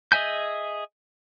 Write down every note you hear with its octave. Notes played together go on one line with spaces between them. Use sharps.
G#4 D#5 E5 G#5 G6